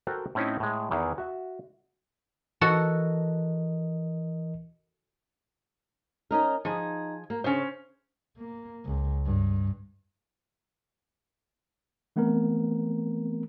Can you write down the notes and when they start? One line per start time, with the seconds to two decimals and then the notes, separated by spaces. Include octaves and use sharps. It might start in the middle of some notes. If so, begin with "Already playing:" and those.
0.07 F#4 A4 A#4 C5 F#5 G5
0.35 A2 C4 C#4 D#4 E4
0.60 A2 G#3
0.91 E2 D#3 E3
1.18 F#4 E5
2.61 E3 F#4 A4 A#4 D#5
6.31 C#4 D#4 A#4
6.65 F3 D#4 G#4
7.30 A#3
7.44 C#3 C#4 C5
8.37 A#3
8.85 C#2
9.25 G2
12.16 E3 A3 B3 C4 A#4